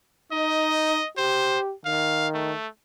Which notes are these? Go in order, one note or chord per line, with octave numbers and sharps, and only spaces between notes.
D#4 D#5
G4 C5
D#3 F5
A3